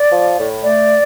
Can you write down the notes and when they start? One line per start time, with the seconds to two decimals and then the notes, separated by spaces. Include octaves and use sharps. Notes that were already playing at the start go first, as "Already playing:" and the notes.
Already playing: D5
0.10 F3
0.37 A2
0.63 A3 D5